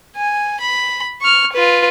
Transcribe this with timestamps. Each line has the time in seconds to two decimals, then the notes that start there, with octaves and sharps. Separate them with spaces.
0.16 G#5
0.61 B5
1.21 C#6 F6
1.53 F4 B4